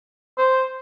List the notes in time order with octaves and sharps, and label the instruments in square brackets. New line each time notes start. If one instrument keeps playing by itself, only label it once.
[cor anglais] C5